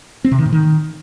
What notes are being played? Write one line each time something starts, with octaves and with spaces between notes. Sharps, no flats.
C4
C3
D#3
A2
D#3